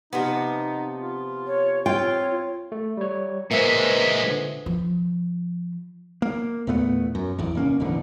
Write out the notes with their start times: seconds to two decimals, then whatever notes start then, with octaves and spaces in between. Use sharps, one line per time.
0.13 C3 F3 B3 D#4
1.00 F4
1.47 C#5
1.86 C4 F4 C#5 G5
2.72 A3
2.97 G3 C#5
3.51 A#2 G#3 A#3 B4 C5 E5
4.24 D3
4.66 F3
6.22 A#3
6.67 E2 A#2 A3 B3
7.15 F#2
7.38 G#1 E2
7.55 F1 A#3 C#4
7.80 E1 A1 F2 D3